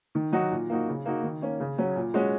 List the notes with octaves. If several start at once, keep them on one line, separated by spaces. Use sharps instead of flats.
D#3
F#3 D#4 F#4
A#2
A#3 D#4 F#4
C#3
A#3 D#4 F#4
D#3
A#3 C#4
C#3
F#3 C#4
A#2
G#3 C#4 F#4